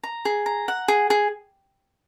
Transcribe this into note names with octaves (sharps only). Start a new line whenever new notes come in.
A#5
G#4
A#5
F#5
G#4
G#4